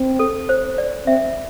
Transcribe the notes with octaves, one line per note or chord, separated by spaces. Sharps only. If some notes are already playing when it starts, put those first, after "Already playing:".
Already playing: C4
A4
C5
D5
C4 E5